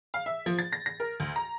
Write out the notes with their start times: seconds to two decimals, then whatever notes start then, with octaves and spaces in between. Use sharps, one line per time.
0.14 F5
0.26 E5
0.46 F3
0.59 A6
0.73 A#6
0.86 A#6
1.00 A#4
1.20 D2
1.36 A#5